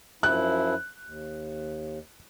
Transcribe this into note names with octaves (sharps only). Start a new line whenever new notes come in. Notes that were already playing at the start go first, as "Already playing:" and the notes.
F#2 F3 E4 F#6
D#2